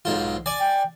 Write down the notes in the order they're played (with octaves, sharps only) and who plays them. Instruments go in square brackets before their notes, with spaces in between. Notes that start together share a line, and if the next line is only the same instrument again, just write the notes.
[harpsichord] B1 G#2 F4
D5 G#5
[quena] G5